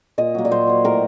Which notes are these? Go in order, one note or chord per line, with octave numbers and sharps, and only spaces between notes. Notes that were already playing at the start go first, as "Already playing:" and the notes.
A#2 D#5
F#3 A#3
D5
A#2 C5
F#3 A#3
A2 A#4